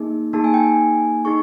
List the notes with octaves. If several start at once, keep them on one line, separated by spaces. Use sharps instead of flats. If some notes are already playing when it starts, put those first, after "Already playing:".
Already playing: A#3 D#4 G#4
A#3 D#4 G#4 A5
G#5
G5
G#5
D#4 G#4 C#6